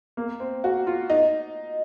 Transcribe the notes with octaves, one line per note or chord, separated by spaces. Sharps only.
A#3
C4
F#4
F4
D#4